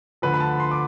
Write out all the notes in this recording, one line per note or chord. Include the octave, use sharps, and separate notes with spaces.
D2 D3 F3 B4
B5
A5
C6
D6